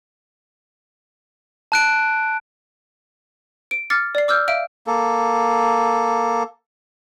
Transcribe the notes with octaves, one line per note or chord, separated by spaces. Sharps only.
A5 F#6 D7
D7
D6 F6 A6 C7 C#7
D5 C7
D6 E6 F6 G6
E5 F5 D7
A#3 A4